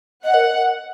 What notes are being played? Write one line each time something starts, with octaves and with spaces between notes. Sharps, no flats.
D#5 F#5
A#4